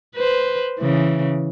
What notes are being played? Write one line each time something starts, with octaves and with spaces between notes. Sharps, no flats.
B4 C5
C#3 E3